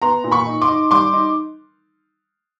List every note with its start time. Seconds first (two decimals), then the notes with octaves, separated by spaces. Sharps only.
0.02 B3 A#5 C6
0.24 A#2
0.31 B5 C#6
0.46 D#4
0.62 C6 D6
0.68 D#4
0.91 G3 C6 D6
1.13 D#4